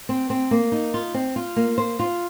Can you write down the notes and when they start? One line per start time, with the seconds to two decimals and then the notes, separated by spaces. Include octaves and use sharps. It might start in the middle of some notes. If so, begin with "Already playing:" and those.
0.09 C4
0.30 C4
0.51 A#3
0.72 D#4
0.94 F4
1.14 C4
1.36 F4
1.56 A#3
1.78 C5
1.99 F4